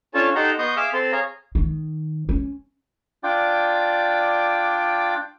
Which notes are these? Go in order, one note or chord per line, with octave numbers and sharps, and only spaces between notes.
C#4 D4 F4 A4 C#5 A5
D#4 G4 A4 F#5 A#5 C6
B3 D#5 C6 C#6 D#6 G6
G#4 E5 F5 D6 E6 F6
C4 A4 C6
G#4 C#5 F5 A#5
D#3
C#4
D4 F4 D5 G5 D6